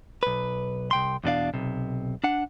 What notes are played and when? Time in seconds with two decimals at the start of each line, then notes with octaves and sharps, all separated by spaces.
0.23 B1 B4
0.91 C2 G5 C6
1.24 E2 B2 D4 F5
1.54 B1 C3
2.24 D4 F#5